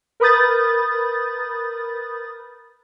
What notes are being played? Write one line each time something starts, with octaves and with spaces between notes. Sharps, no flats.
A#4 B4 B5 D#6 G6 A6